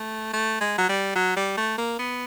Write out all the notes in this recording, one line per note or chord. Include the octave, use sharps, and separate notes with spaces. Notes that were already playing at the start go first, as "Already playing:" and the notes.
Already playing: A3
A3
G#3
F#3
G3
F#3
G3
A3
A#3
B3